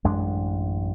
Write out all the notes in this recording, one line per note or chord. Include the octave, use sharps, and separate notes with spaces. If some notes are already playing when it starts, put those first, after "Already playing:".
A1 F#2 G#3 D4